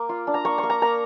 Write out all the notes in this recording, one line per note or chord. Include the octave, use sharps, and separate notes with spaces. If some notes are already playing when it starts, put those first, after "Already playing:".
Already playing: A#3 D6
F4
D4
A#5
A#3 C#6
C#6
A#3
A#5
A#3 A#5